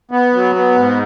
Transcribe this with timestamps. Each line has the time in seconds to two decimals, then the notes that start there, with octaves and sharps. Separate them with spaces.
0.11 B3
0.34 F#3
0.55 B3
0.76 G#2